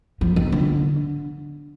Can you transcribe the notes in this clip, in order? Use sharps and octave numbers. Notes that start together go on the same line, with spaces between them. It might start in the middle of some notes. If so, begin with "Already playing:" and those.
F3
D#3
D3